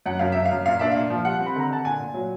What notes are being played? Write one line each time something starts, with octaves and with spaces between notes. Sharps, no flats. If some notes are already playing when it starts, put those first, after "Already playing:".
F#2 F#5
F#2 F5
F#2 E5
F5
F#2
A#2 F5
D4 E5
A#2 F5
F3
G3 F#5
C4
B5
D3 A#5
D3 A5
A#2 G#5
A#2
F#3